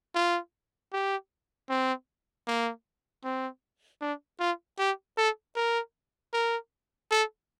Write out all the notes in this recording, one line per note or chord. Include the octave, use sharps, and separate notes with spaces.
F4
G4
C4
A#3
C4
D4
F4
G4
A4
A#4
A#4
A4